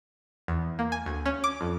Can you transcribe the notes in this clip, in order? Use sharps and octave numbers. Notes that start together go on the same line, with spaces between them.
E2
A#3
G#5
D2
C#4
D6
F2